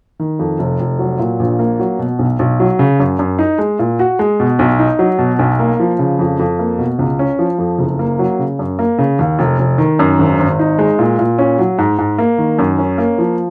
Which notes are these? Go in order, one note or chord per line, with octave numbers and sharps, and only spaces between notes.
D#3
F2
F1
F1
F#3
A#2
A#1
A#3
F#3
B2
B1
B1
F#3
C#3
F#2
F#2
D#4
G#3
A#2
F#4
G#3
B2
B1
D#4
F#3
B2
B1
A#3
F3
C#3
F2
F2
A#3
B2
C#2
C#4
F3
F2
F#1
A#3
F#3
C#3
F#2
A#3
C#3
D#2
F1
F1
D#3
F#2
G#1
G#1
D#4
G#3
A#2
A#2
C#4
F#3
G#2
G#2
A#3
D#3
F#2
C#4
A#3
F3